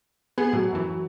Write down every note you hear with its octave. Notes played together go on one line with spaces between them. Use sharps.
B3 G#4
A2 F#3
F#2 E3